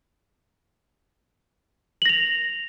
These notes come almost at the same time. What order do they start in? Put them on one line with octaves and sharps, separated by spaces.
F#7 A#6 F7